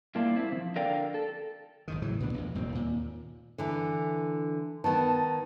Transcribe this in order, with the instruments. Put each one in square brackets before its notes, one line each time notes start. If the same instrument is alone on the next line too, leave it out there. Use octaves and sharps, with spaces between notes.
[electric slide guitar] G2 A#2 A#3 D4 E4 F4
C4 E4
C#3 F3
D3 A#4 D5 F5 G5
A4
[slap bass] G#1 G#2 D#3
A2 C#3 E3 F#3
A#2 B3 D4
G#1 F2
D#1 G#2 B2 C4
D#2 A#2
[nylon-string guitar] D3 E3
[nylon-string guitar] D#3 B3 [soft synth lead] A5